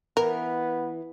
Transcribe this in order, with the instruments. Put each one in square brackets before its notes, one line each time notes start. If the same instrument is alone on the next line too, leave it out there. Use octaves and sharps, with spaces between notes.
[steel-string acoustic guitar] E3 [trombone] B3 [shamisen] A#4